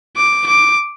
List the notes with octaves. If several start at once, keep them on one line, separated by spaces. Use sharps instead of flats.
D6
D6